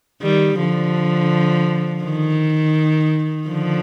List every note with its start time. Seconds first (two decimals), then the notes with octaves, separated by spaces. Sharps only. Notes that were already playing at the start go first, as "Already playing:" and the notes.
0.22 D#3 G3
0.58 D3 F3
2.04 D#3
3.48 D3 F3